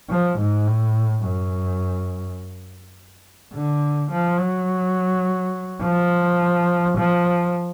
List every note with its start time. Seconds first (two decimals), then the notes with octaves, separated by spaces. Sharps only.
0.10 F3
0.39 G#2
0.68 A2
1.25 F#2
3.54 D3
4.11 F3
4.39 F#3
5.83 F3
6.97 F3